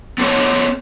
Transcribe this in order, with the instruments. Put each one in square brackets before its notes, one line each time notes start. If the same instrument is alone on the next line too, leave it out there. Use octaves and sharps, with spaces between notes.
[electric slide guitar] B3 C4 A4 C#5 D#5